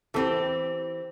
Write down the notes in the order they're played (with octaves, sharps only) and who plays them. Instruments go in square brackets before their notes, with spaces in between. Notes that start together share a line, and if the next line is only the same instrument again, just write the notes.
[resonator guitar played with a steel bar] E3 C4 G4 [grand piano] A4